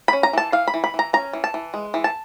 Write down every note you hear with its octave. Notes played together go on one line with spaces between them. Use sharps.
C#4 B5
A#5
E3 A5
E3 F5
B5
E3
B5
E3
A#5
C#4 A#5
E3
A5
E3
G#3
E3
A5